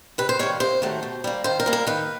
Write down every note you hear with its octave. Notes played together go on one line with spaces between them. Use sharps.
C3 B4
C5
D#3 G3 A#3 C#5
C3 C5
D#3 F#3 A3
B2
G3 A#3
D#3 C5
A#4
G3 A#3
A#4
D#3 B4